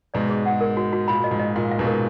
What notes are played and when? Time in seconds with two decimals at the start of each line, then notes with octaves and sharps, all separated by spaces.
0.14 G#2 B2 D5
0.29 G#4
0.46 F#5
0.61 A#4
0.77 F#4
0.93 F#4
1.08 A#2 B5
1.24 D#5
1.31 G#2
1.40 D#5
1.56 A#2 F5
1.71 F5
1.79 G#2 B2
1.87 A#4